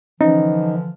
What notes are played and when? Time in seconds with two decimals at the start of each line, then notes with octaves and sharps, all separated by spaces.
0.21 D3 E3 F3 C#4 D#4